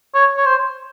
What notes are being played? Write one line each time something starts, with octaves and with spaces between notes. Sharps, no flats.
C#5
C#5
C5